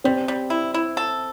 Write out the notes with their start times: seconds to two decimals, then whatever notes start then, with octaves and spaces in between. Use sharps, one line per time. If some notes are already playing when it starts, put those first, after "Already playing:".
0.04 G3 C4 C5
0.28 G3
0.50 E4
0.74 E4
0.97 A4